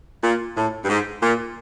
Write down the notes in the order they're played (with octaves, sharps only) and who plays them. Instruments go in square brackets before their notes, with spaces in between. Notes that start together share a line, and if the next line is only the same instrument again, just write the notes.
[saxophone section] A#2
A2
G2
G#2
A#2